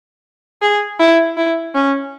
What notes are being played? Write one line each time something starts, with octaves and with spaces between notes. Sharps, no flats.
G#4
E4
E4
C#4